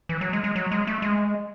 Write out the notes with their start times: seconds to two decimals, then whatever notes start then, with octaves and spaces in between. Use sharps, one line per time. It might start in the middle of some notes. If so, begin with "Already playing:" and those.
0.09 E3
0.21 F#3
0.33 G#3
0.44 G#3
0.56 F#3
0.71 G#3
0.87 A3
1.02 G#3